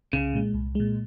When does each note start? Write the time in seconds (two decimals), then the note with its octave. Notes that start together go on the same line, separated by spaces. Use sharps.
0.12 C2 C#3
0.34 A#2 G#3
0.54 C2
0.75 A#2 G#3